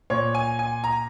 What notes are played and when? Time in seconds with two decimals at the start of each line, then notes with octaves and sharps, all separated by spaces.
0.10 A#2 C#5
0.35 G#5
0.59 G#5
0.84 A#5